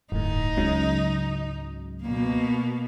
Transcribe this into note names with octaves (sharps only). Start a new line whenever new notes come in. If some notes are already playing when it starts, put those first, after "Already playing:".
D1 G1 A2 D#4
C#2 G#2 C#3 F#3
B2 A#3